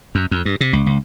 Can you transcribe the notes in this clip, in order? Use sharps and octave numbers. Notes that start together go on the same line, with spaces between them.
F#2
F2
G2
C3
C#2
C#2